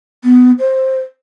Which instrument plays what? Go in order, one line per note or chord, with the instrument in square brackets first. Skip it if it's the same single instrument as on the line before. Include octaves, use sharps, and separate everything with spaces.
[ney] B3
C5